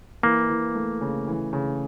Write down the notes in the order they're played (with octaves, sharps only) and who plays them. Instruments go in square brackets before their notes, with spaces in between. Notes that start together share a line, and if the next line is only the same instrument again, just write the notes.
[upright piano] E3 [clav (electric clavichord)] A#3
[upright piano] E3
A3
C#3
E3
C#3